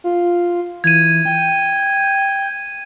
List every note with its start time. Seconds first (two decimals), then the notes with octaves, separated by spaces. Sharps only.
0.04 F4
0.84 E3 G#6 D#7
1.25 G5